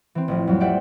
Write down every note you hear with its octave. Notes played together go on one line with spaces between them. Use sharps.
E3 C4
A1 F3
F2 F#3 G3
C4 G4 D5 E5 F#5 G5